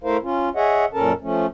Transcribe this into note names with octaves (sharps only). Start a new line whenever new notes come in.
A3 E4 A#4 C5 F5
C#4 F4
G#4 C#5 D#5 E5 F#5
F#2 A#2 C#4 A4 A#4 A5
F3 A3 C#4